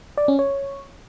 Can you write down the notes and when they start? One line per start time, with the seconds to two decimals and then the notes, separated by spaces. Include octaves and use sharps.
0.17 D5
0.28 C#4
0.39 C#5